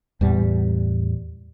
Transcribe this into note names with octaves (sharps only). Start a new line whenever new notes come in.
E2 A2 G3